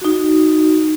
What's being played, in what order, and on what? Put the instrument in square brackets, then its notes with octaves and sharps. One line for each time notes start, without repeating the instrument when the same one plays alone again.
[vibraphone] D#4 F#4